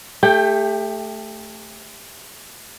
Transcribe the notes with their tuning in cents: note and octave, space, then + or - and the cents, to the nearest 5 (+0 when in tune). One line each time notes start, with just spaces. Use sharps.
A3 +0 G4 +30 G5 +5